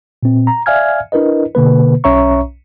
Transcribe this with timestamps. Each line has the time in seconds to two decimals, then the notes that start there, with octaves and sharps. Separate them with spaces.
0.23 A#2 C4
0.47 A#5
0.66 D5 E5 F5 G#5 F6 G#6
1.12 D4 E4 A#4 B4 D#5
1.55 B2 D3 A#3 B4
2.04 B1 C#4 C#5 E5 A#5 C#6